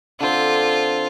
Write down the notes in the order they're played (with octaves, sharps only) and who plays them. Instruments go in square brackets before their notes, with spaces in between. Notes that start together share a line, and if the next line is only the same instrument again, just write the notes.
[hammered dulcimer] D3 C4 [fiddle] F4